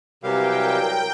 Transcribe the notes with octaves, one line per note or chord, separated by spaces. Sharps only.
C3 E3 F#3 G3 G4 A#4 F5 G5